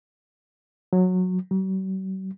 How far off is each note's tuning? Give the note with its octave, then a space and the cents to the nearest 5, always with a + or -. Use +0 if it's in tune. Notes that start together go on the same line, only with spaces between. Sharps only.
F#3 -15
F#3 +45